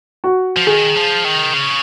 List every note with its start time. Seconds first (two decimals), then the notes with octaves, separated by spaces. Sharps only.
0.24 F#4
0.57 F3
0.67 D#3 G#4
0.95 F3
1.25 D#3
1.54 C#3